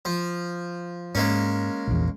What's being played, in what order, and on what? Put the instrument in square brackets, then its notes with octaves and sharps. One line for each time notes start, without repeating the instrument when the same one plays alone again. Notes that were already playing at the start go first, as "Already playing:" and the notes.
[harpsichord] F3
[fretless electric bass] G#2 [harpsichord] G#3 A#3 C#4
[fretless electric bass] A#1 E2